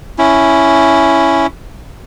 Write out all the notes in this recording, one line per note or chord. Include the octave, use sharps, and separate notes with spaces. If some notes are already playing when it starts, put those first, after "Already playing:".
C#4 E4